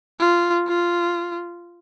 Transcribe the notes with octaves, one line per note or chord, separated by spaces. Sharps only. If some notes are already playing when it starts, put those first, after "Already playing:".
F4
F4